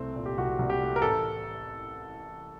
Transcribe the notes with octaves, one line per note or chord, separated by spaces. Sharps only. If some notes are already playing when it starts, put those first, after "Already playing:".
Already playing: C2 A3 C4
A#2
G4
C2 F#4
C2
G4
A3
A#4
A1 A4